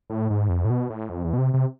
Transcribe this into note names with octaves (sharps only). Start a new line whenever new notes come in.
A2
G#2
F2
A2
B2
A2
F2
E2
B2
C3
C3